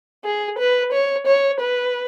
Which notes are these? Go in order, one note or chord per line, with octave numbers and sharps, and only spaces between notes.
G#4
B4
C#5
C#5
B4